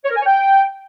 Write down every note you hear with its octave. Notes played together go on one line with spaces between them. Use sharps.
C#5
A#4
G#5
C#5
G5